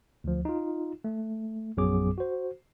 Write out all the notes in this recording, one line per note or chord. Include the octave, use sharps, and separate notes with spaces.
D2 F3
D#4 F4
A3
A#1 F#2 F#3 B3 G#4 D6
F#4 C5